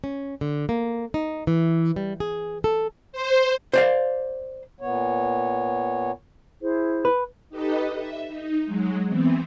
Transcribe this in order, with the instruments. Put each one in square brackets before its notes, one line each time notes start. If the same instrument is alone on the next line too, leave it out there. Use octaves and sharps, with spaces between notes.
[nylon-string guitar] C#4
D3
A#3
D#4
E3
G3
G#4
A4
[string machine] C5
[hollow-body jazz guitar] C5 D5 F5
[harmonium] A#2 B3 C#5
[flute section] E4 G#4 C5
[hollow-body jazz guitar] B4
[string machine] D#4 G4 A4 B4 D#5
E5
D#4
F#3 G#3
E3 B3 C4